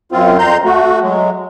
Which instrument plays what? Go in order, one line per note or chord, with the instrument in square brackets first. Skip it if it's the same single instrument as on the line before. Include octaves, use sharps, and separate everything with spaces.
[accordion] F#2 C4 F4
F2 A#5 C6 G6
A3 F#4
F#3 G#3